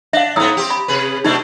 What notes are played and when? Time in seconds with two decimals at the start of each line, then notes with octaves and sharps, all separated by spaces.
0.13 D4 E5 F5
0.36 G#2 B3 A#5 D#6 E6
0.57 C4 G4
0.70 B5
0.88 C3 G#4 B4
1.24 B2 A3 D4 D#4